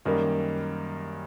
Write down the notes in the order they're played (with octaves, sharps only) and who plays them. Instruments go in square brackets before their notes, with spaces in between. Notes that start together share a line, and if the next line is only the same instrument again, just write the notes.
[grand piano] F#2 D#3 G3 A#3